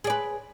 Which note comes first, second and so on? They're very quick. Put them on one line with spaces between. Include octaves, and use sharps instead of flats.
G#4 D5 B4